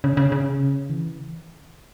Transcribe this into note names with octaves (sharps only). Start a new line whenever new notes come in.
C#3
C#3
C#3
E3